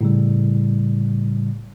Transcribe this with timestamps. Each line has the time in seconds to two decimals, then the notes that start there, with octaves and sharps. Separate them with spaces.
0.01 A2 C#3 G3